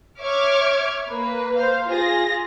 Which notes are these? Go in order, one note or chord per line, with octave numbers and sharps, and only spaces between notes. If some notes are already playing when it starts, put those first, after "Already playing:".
C#5 E5 C#6 D6 F6 G#6
A#3 B4
C5 F5
F4 G#4 A#6